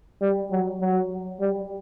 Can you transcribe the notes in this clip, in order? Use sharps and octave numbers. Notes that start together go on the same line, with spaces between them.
G3
F#3
F#3
G3